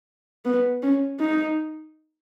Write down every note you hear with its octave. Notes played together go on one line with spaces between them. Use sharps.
B3
C#4
D#4